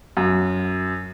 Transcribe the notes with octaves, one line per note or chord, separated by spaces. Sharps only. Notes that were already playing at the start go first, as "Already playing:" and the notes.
F#2